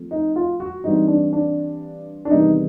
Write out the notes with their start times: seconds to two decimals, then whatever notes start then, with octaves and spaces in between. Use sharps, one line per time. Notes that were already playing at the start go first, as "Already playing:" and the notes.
Already playing: F3 A3 C4
0.11 D#4
0.36 F4
0.60 F#4
0.84 G2 E3 G3 C4 D#4
1.08 D4
1.33 D4
2.25 D4
2.30 E2 C3 D#3 G3 B3 D#4